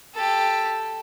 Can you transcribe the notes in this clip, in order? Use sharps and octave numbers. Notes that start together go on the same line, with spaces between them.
G4 A4